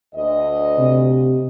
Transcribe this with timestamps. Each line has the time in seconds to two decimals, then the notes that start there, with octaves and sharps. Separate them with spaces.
0.15 D2 D#5
0.78 C3